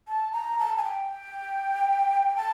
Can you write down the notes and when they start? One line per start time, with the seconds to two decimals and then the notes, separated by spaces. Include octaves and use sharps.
0.08 A5
0.32 A#5
0.59 A5
0.77 G#5
0.84 G5
2.36 A5